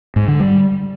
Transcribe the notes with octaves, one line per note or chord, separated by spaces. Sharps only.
G#2
D3
G3